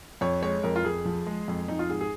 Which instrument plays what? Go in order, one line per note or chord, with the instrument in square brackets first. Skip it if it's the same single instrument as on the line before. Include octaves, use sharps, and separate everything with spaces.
[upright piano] F2 C#5
G#3 C#5
F2 A#4
F4
F2 G#4
F3
G#3
F2
F2 D#4
F4
G#2 G#4
G#4